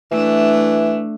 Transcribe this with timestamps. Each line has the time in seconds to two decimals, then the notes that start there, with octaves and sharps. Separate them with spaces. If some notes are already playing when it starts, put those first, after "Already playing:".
0.11 E3 A3 D4